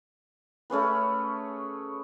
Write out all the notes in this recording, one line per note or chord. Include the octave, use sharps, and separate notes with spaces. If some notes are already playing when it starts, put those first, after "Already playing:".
A3 C#4 G#4 B4